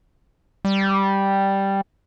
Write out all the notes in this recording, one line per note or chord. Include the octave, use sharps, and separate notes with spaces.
G3